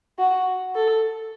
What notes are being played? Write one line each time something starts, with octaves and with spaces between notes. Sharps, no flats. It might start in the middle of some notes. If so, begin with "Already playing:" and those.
F#4
A4